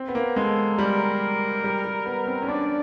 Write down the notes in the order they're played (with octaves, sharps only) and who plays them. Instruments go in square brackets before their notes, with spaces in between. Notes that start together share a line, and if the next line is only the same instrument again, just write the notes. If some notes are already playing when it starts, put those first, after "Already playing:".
Already playing: [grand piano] C4
B3
A#3
[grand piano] G#3 [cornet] A4
[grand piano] G3 [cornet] A#4
[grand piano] G3
G3
B3
C4
C#4
[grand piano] D4 [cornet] D5